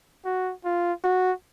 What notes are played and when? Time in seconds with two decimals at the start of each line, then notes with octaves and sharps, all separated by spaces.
0.25 F#4
0.65 F4
1.04 F#4